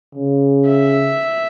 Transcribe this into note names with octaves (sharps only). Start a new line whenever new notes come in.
C#3
E5